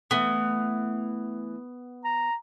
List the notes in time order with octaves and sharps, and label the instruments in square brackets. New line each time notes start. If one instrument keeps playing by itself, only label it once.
[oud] E3 A3 [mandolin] B3
[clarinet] A#5